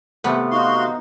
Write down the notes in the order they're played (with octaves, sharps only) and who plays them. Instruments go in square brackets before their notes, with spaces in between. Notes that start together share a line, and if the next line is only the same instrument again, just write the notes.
[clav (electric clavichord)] C3 A3 [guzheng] B3
[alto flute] D#4 [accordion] F#4 F5 C6